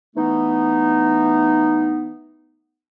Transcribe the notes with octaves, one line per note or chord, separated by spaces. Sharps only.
E3 A3 B3 D#4